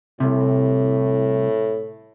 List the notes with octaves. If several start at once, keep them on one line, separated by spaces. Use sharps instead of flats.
C2 A2 C3